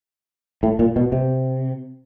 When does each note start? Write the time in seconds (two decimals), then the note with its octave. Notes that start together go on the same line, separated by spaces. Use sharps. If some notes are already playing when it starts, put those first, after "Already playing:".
0.63 A2
0.79 A#2
0.96 B2
1.12 C3